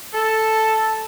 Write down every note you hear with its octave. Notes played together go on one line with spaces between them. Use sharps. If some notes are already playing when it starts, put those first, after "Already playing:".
A4 A5